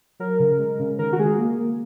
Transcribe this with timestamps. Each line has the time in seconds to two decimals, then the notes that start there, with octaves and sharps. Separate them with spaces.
0.20 F#3 A#4
0.39 C#3
0.59 G#3
0.79 C#3
0.99 D#3 A#4
1.13 F#4
1.19 G#3 G#4
1.38 A#3
1.59 A#3